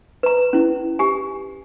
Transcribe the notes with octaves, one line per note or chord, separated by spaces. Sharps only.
B4 A#5
C#4 E4
G4 G#5